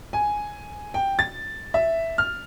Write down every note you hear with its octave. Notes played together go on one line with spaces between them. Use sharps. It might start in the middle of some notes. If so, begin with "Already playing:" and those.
G#5
G5
A6
E5
F6